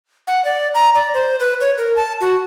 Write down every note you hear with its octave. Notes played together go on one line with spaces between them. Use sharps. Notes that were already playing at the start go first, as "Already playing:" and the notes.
F#5
D5
A#5
D5
C5
B4
C#5
A#4
A5
F#4